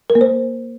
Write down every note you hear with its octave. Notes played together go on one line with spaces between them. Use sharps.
A#4
A#3
C5